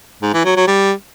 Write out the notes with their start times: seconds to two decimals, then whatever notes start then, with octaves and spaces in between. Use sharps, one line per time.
0.22 G#2
0.34 E3
0.45 F#3
0.56 F#3
0.68 G3